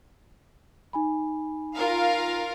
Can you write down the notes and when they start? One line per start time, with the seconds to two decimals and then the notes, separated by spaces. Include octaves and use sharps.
0.93 D#4 G#5 B5
1.75 F4 A#4 F5